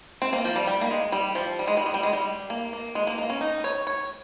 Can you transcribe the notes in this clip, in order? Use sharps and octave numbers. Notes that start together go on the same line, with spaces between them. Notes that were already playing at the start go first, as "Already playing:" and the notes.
C4
A#3
F3
G3
G3
A#3
G#3
G3
F3
G3
G#3
G3
G#3
G3
G#3
G3
A#3
A#3
G#3
A#3
A#3
C#4
D#4
C#5
C#5